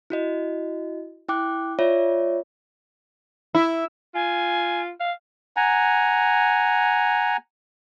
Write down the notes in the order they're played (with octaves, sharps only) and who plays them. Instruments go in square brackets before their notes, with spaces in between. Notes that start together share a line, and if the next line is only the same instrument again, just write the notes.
[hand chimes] E4 F#4 D#5
E4 G5 D6 F#6
F4 C#5 D5 E5
[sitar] E4
[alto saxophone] F4 [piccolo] G#5
[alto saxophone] F5
[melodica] F#5 G#5 A#5